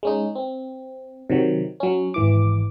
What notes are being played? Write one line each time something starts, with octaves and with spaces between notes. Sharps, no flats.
G#3 C#4 D#4
C4
C3 D#3 F#3
F#3 C#4
G#1 E3 D6